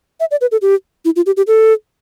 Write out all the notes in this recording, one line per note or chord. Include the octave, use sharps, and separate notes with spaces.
E5
D5
B4
A4
G4
E4
F4
G4
G4
A4